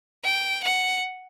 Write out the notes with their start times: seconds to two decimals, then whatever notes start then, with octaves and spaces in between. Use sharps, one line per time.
0.24 G5
0.63 F#5